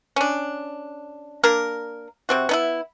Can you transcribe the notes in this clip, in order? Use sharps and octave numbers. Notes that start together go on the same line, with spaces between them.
C#4 D4
A#3 D4 A#4
C3 C4 F#4
B3 D#4 E4